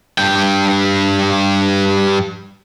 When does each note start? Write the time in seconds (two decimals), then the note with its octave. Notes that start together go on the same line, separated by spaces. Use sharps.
0.18 G2 G5